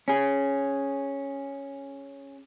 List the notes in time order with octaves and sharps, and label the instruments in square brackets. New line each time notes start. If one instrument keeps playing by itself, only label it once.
[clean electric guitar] C#4 G#4